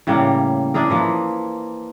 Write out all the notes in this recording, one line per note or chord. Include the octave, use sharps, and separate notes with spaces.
A2 C#3 G3 A#3
D4 E4 G#4 A#4
E3 F3 A#3